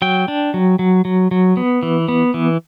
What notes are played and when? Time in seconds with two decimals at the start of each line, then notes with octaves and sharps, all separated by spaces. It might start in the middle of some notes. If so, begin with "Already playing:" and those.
0.02 F#3 G5
0.28 D4
0.54 F#3
0.79 F#3
1.05 F#3
1.31 F#3
1.57 B3
1.83 E3
2.08 B3
2.34 E3